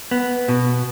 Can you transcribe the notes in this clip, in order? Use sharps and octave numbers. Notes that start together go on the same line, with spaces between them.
B3
B2